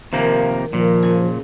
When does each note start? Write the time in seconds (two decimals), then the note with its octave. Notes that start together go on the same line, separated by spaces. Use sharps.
0.13 C3 D#3 F3 A#3
0.73 A#2 D#3 F3
1.02 F#2 C#3 G#5